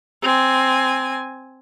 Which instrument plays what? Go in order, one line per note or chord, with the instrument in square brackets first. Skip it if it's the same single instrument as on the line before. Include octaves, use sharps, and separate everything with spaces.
[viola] C4 G#5